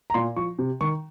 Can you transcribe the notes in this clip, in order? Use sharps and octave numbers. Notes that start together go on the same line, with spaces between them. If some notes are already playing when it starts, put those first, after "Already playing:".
A#5
A#2 C6
F3 C#6
C3
D#3 C#6